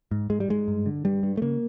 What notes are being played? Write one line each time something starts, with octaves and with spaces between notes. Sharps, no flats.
G#2
G#2 G#3
G3
G#2 G#3
G2
D3
G2 G3
G2
A3
C#3 A#3